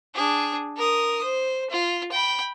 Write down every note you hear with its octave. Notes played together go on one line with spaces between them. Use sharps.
D4 G#4
A#4 D#6
C5
F4
G5 B5